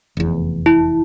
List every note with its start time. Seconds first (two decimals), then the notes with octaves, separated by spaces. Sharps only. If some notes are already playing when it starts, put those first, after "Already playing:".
0.17 F1 E2
0.66 E4